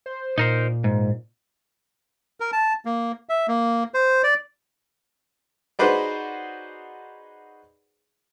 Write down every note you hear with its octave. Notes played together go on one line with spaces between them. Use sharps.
C5
A#2 D#4 A#4 C5
G#2
A#4
A5
A#3
E5
A#3
C5
D5
D#4 F#4 G#4 B4 C5 D5